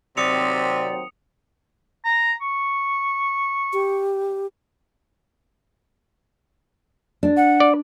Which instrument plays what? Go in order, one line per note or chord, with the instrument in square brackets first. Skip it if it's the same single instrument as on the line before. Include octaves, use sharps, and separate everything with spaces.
[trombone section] D#2 F#3 C4 [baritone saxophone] C3 [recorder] D5 [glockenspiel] D#6 C#7 F7
[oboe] A#5
C#6
[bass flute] G4
[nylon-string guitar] D4
[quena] F#5
[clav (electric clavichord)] D5